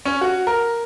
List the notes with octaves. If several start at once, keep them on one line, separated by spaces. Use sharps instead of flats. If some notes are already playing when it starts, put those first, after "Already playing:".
C#4
F#4
A#4